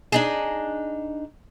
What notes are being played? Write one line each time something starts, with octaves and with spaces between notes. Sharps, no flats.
D4 D#4 G#4